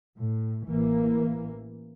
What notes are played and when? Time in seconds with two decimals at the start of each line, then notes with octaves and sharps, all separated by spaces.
0.15 A2
0.66 A1 E3 A#3